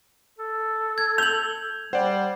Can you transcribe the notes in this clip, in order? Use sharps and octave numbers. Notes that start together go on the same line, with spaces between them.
A4
G#6
G6 F7 F#7
G3 C5 D5 F#5 G5